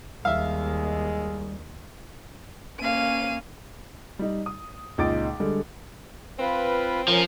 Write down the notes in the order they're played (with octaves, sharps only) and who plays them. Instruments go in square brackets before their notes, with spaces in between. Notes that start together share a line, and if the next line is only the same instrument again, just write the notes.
[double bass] D#2 [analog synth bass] G3 [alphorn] G#3 [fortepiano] E5 F5
[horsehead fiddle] A#3 C#4 [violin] F5 D#7
[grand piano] G3 D#4
D#6
C#2 A#2 D#4 D6 A6 D7
D3 G3 G#3
[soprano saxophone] C4 [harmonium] F4 B4
[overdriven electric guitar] F3 [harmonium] C#4 A#4 A#5